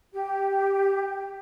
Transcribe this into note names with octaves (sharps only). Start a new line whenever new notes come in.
G4